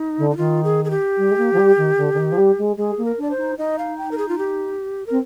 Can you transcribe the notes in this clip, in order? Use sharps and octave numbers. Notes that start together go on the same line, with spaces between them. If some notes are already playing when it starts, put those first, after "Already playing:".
Already playing: D#4
D3
D#4
D#3 F4
G#4
G#4
G4
G3
G#3
A#3
F3
G3
D#3
D3
D3
D#3
F3
G3
G#3
G#3 G#4
A#3
A#4
D4 D5
C5
D#4
D#4 D#5
F5
G5
A#4
G#4
F4
G4
C4 A#4